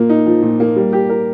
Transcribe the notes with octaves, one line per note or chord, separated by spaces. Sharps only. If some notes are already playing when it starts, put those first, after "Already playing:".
Already playing: A#2 A#3
D#4
F3
A#2
A#3
G3
G4
A#4